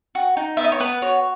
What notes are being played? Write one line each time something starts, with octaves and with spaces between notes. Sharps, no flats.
F#4
D#4
B3 E5
D#5
C#5
B3 B4
F#4 C#5